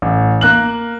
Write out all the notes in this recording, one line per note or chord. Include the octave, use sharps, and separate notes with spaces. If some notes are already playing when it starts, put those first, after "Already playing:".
A1
A#3 F#6 F#7